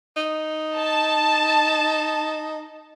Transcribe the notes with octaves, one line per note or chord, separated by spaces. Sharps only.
D#4
A5